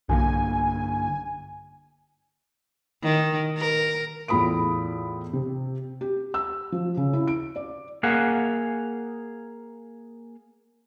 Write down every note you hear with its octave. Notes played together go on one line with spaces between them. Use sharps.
B1 G2 D3 A#3 G#5
D#3
A#4
E2 A2 F4 B5 D#6 D7
C3
G4
E6
F3
C#3
E4
D7
D5
A#3 G#4 F5 F#5